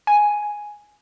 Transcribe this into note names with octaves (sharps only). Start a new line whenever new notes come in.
G#5